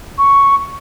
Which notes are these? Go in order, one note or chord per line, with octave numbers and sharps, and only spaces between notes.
C#6